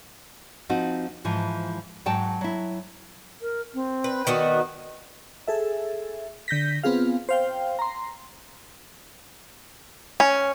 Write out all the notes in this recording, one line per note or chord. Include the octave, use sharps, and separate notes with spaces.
F3 C4 D#4 F#4
G#2 E3 F3
G#2 F#3 F#4 G5 A5
F#3 E4
A#4
C4
B4
D#3 B3 F#4 D5
G#4 A4 E5
D3 G6 A#6 B6
B3 C4 F4 G#4 F5
C5 F5 G5
A#5 C6
C#4